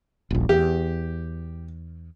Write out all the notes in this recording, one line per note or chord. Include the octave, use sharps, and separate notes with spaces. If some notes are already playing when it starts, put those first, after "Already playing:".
D#1 A#1
E2 G4